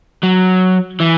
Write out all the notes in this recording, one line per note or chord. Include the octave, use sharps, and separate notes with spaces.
F#3
E3